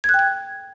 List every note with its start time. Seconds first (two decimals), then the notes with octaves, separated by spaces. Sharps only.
0.04 G#6
0.09 F#6
0.14 G5
0.19 G#6